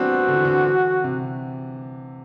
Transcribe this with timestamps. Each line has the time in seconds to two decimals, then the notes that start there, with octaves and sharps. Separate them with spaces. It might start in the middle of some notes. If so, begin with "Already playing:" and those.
Already playing: E3 G3 A3 B3 C4 D4 F#4
0.28 D3
0.36 E3
0.45 D3
0.67 E3
1.04 C3